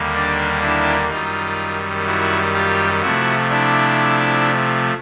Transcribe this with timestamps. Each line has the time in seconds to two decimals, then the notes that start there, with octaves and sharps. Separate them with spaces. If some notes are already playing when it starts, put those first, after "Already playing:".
Already playing: D#2 D3 G3 A#3
0.15 D4
0.62 D4 E4
1.10 F#2 D#3 G3 D#4 F4
2.06 E4 F#4
2.54 F4 G4
3.02 C3 F3 A3 E4 F#4
3.50 D4 E4